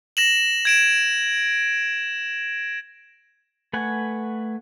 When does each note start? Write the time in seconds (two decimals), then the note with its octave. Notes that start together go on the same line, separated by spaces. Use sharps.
0.17 A#6 E7 F#7
0.65 G#6 D7 E7
3.73 A3 B4 F#5 G#5